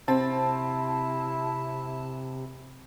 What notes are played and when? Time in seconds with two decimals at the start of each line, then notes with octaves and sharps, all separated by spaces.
0.08 C3 C4 E4 A5